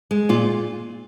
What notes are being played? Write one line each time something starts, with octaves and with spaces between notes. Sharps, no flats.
G#3
A#2 F4